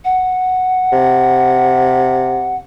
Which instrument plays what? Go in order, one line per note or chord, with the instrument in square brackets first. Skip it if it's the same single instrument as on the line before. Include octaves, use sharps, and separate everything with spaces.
[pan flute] F#5
[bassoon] C3